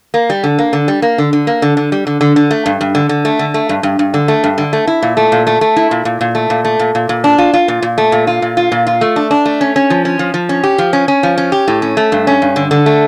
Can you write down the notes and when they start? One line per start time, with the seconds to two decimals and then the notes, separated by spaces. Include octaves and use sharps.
0.14 A#3
0.30 G3
0.44 D3
0.59 A#3
0.73 D3
0.88 G3
1.02 A#3
1.18 D3
1.33 D3
1.47 A#3
1.62 D3
1.77 D3
1.92 G3
2.07 D3
2.21 D3
2.36 D3
2.51 A3
2.66 G2
2.81 G2
2.95 D3
3.09 D3
3.25 A3
3.39 D3
3.54 A3
3.69 G2
3.83 G2
3.99 G2
4.14 D3
4.28 A3
4.44 G2
4.58 D3
4.73 A3
4.87 E4
5.02 A#2
5.17 A3
5.32 A#2
5.47 A3
5.61 A3
5.76 E4
5.91 A#2
6.05 A#2
6.21 A#2
6.35 A3
6.50 A#2
6.65 A3
6.79 A#2
6.95 A#2
7.09 A#2
7.24 D4
7.38 F4
7.54 F4
7.68 A#2
7.82 A#2
7.98 A3
8.12 A#2
8.27 F4
8.42 A#2
8.57 F4
8.72 A#2
8.87 F4
9.01 A3
9.16 D4
9.31 D4
9.45 A3
9.61 C#4
9.76 C#4
9.90 F3
10.05 C#4
10.19 F3
10.34 F3
10.49 C#4
10.64 G4
10.78 F3
10.93 C#4
11.08 C#4
11.23 F3
11.38 C#4
11.52 G4
11.68 A2
11.82 C#4
11.97 A3
12.12 G2
12.27 C#4
12.42 G2
12.56 D3
12.71 D3
12.86 A3